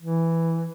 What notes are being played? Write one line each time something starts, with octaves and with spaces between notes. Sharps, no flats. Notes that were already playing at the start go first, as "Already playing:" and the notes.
E3